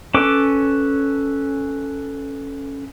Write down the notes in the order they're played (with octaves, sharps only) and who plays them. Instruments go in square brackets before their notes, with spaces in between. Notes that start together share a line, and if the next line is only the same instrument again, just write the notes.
[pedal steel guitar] C#4 A4 B4 D6